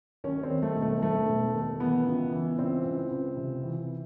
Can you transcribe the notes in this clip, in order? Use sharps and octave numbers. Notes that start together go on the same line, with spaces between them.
D#2 C#4
C4
D#3
A3
E1
A3
E1 A3
E1
D#2
E3 B3
C#2
E3
C#2 C4
C#2
C#2
C3
E3